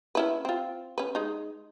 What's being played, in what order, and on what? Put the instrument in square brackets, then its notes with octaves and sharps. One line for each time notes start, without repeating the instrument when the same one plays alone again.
[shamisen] C#4 E4 B4
C4 F4
C#4 B4
G#3 D#4